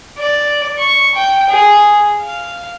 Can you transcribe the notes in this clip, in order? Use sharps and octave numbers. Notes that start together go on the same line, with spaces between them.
D5
C#6
G5
G#4
F5